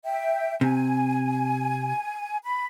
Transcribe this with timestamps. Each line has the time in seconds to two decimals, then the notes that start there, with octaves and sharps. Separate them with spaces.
0.05 E5 G5
0.61 C3 G#5
2.44 B5